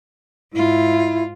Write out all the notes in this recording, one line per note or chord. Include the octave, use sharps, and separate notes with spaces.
G#2 E4 F4